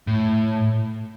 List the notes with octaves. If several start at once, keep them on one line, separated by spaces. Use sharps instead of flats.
A2